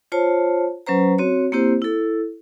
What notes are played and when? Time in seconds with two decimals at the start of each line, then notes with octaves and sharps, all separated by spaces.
0.12 F4 C5 C#5 A5
0.87 F#3 C#4 B4 C5 A#5
1.18 C4 F#4 C#5
1.52 A#3 C4 E4 G4 C5
1.82 E4 A4